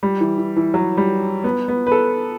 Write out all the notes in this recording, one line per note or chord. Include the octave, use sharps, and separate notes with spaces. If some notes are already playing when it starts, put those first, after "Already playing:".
G3
E3
E3
E3
F#3
G3
B3
B3
B4
A4